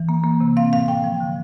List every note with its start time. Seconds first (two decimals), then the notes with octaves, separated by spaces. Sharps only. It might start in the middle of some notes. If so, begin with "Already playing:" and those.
Already playing: E3
0.09 A#3
0.23 A#3
0.40 C3
0.57 C4 F5
0.73 A2 F5
0.88 A2 G5
1.04 F3
1.20 D3